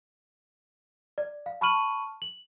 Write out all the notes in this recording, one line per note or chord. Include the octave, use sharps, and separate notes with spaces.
D5
F5
A5 B5 C#6 F6 D#7 F#7
F#7